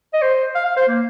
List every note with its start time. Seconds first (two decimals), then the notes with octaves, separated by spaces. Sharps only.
0.13 D#5
0.22 C5
0.55 F5
0.65 F5
0.77 C5
0.88 A#3